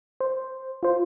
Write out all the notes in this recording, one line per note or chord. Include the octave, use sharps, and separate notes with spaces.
C5
F4 C5